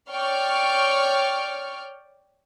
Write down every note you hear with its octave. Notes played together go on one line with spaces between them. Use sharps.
C#5 D5 G5 C#6 F6